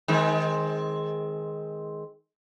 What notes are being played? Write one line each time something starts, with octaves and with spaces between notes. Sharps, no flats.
D#3 G#3 C4